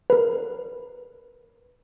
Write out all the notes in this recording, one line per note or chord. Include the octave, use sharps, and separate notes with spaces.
A#4 B4